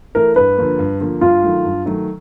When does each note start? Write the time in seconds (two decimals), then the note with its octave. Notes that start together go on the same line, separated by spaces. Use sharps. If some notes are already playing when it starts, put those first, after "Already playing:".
0.15 E3 A3 A#4
0.36 G2 B4
0.57 D3 F3 A#3
0.79 G2
1.00 D3 F3 A#3
1.21 G2 F4
1.43 D#3 F#3 A3
1.65 G2
1.86 D#3 F#3 A3